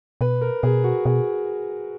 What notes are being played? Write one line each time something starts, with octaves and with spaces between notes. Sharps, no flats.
B2 B4
A#4
B2 G#4
F#4
B2 G#4